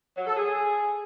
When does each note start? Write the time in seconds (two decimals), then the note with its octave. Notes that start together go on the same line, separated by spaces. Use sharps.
0.17 F#3
0.27 A4
0.37 G#4